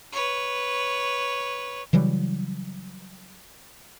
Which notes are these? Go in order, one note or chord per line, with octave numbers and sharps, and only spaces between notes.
B4 C#5
C#3 E3 F#3 G3